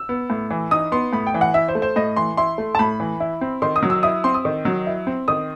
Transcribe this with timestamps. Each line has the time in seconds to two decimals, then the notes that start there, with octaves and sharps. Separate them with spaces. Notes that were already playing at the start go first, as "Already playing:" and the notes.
Already playing: E6
0.09 B3
0.30 A2
0.50 E3
0.71 D#4 D#6
0.92 B3 C6
1.13 A2 B5
1.27 G5
1.34 E3
1.41 F#5
1.54 E4 E5
1.68 C5
1.75 A3
1.82 C5
1.96 A2 D#5
2.16 E3 C6
2.37 E4 C6
2.58 A3
2.75 A5
2.79 A2 B5
3.00 E3
3.20 E4
3.41 C4
3.62 D#3 C6
3.76 D#6
3.83 F#3
3.90 E6
4.03 E4 D#6
4.24 C4 C6
4.34 D#6
4.45 D#3
4.65 F#3
4.87 E4
5.07 C4
5.28 D#3 D#6